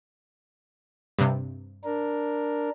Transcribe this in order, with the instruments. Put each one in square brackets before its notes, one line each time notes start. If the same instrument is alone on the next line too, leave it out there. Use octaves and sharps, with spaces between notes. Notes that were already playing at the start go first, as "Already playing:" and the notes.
[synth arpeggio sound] G2 C3
[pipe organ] D4 A#4